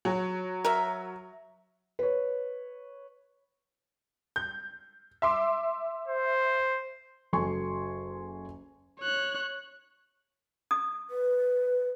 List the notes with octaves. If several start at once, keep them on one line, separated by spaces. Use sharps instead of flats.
F#3
A#4 E5
B4 C#5
G6
E5 C6 D6
C5
F#1 F#3 A4 G#5 C6 C#6
C#5 F#6
D#6
B4